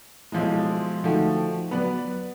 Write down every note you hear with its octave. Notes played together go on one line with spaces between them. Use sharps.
B1 F3 G#3 E4 C6
D3 F3 A3 D#4 F#4 G5
F#3 B3 B4 D5